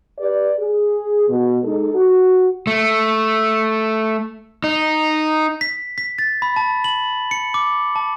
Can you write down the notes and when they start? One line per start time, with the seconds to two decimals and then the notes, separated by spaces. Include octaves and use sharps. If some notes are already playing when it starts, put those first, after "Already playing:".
0.19 G4 B4 D5
0.59 G#4
1.29 B2
1.64 G#3 D#4 A4
1.95 F#4
2.67 A3
4.64 D#4
5.61 B6
5.98 B6
6.18 A6
6.42 B5
6.56 A5
6.84 F#7
7.31 C#7
7.54 D6
7.96 A5